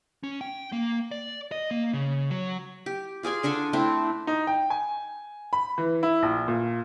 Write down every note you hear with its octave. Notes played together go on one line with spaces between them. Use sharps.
C#4
G5
A#3
D5
D#5
A#3
C#3
F#3
G4
F4 G#4 D5 G#5
D3 D4 A4 G#5
A3 C4 D4 E4
D#4
G5
G#5
B5
E3
E4
A#1
A#2